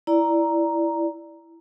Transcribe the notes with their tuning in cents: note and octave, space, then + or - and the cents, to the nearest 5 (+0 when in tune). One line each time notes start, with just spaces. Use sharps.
E4 +10 D5 +0 A#5 +0